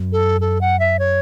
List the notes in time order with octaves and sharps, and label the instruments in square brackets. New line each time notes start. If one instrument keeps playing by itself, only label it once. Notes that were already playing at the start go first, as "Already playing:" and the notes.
Already playing: [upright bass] F#2
[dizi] A4
A4
F#5
E5
C#5